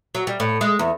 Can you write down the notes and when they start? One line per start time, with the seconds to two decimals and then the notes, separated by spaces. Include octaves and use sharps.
0.15 F#3
0.27 G3
0.40 A2
0.61 G#3
0.79 E2